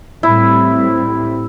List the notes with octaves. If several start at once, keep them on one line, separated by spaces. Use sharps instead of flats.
A2 G3 C4 E4